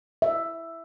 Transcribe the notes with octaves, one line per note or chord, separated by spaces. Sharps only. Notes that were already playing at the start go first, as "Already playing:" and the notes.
E5